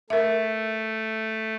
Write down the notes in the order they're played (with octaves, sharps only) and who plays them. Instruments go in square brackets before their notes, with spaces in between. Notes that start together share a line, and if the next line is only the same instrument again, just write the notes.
[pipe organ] A3 [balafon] A#4 E5